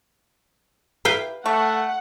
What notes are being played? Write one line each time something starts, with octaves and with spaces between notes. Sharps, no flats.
E4 G4 A#4 B4 F5 G5
A3 E5 F#5 A5 C#6